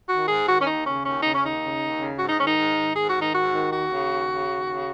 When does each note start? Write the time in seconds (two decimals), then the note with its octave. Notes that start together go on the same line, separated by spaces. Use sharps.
0.09 D#3 F#4
0.28 G#2 G#4
0.47 D#3 F#4
0.60 C#4
0.66 D#2 D#4
0.85 C#3 C#4
1.04 D#2 C#4
1.23 C#3 D#4
1.34 C#4
1.42 D#2 D#4
1.62 C#3
1.81 D#2
2.00 C#3
2.19 G#2 F#4
2.28 D#4
2.38 D#3 C#4
2.47 D#4
2.57 G#2
2.75 D#3
2.95 G#2 G#4
3.08 F#4
3.14 D#3
3.21 D#4
3.33 G#2 F#4
3.53 D#3
3.71 D#2 F#4
3.90 C#3
4.10 D#2
4.29 C#3
4.48 D#2
4.67 C#3